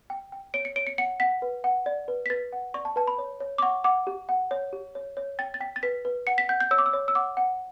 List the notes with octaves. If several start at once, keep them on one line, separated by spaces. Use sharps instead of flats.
G5
G5
C#5 D7
C#7
C#5 D7
C#7
F#5 C#7
F#5 B6
B4
F#5
D5
B4
B6
B4 A6
F#5
D5 C#6
A5
B4 A5
B5
C#5
C#5
D6
F#5 C#6
F#5 D6
G4
F#5
C#5
G4
C#5
C#5
G5 A6
A6
G5 B6
A6
B4 B6
B4
F#5 C#7
B6
F#5 G6
G6
C#5 E6
D6
E6
C#5
E6
F#5 D6
F#5